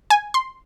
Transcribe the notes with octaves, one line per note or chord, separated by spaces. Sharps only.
G#5
C6